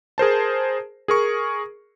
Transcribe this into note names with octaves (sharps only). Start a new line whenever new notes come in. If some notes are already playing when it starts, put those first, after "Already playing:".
G#4 A#4 C5 A5
G#4 A#4 C#6